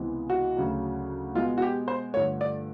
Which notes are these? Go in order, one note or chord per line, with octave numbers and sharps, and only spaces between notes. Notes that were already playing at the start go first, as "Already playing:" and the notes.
Already playing: C#2 C3 E3 G#3 B3
F#4
D2 C#3 F#3
B2 G#3 B3 F4
F#4
G4
C5
G2 D3 F3 A3 C#5
D5